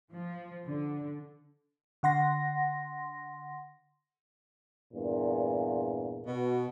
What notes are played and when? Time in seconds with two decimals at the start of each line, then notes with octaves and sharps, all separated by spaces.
0.13 F3
0.66 D3
2.03 D3 F#5 C6 A#6
4.93 E2 G2 A#2
6.25 B2